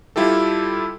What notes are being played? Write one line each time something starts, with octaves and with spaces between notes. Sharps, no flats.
G3 E4 F4 G4 A4